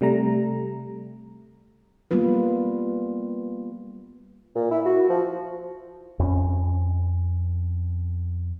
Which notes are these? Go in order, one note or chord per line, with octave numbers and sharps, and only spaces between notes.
C3 G3 A3 A#5
G3 A#3 B3 F4 B4
A#2
E4
F#4
F3
F2 C#4